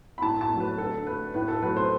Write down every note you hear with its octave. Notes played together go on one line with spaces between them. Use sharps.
B5
A2 A5
A5
F#3 A3
B4
D3 A4
A3 B4
A2 B4
A4
F#3 A3 B4
C5